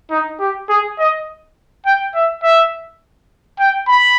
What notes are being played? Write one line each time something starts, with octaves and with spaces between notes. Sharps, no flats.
D#4
G4
G#4
D#5
G5
E5
E5
G5
B5